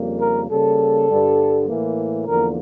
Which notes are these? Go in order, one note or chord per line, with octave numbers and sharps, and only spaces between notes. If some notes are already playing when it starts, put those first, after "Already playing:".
Already playing: F2 C#3 G3 A#3
A#4
C#3 G3 A#3 A4
G2 D3 G3
A2 E3 A#3
E2 D3 F3 A#3 A#4